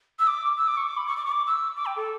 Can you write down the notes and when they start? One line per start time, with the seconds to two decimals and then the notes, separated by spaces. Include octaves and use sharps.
0.19 E6
0.27 D6
0.58 E6
0.67 D6
0.77 C#6
0.87 D6
0.97 B5
1.07 C#6
1.17 D6
1.26 C#6
1.32 D6
1.47 E6
1.77 D6
1.86 G5
1.96 A4